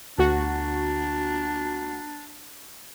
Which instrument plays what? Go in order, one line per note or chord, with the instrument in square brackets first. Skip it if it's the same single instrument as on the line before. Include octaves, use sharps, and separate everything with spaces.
[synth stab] D2 F#4 [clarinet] D4